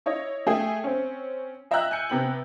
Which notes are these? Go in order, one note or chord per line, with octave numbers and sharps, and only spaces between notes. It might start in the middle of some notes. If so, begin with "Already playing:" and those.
E4 C#5 D#5
A3 G#4 E5 G5
C4 C#4
D#5 E5 G5 A#5 E6 F#6
G#5 G6 C#7
C3 B3 G5 F#7